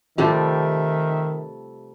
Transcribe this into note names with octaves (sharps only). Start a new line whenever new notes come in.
C3 D#3 F3 G3 A3 G4 E5